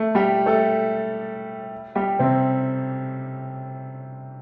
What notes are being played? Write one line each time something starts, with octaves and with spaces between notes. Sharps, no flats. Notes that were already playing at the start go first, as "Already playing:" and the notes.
Already playing: A3
G3 G4
A3 A4
G3 G4
C3 C4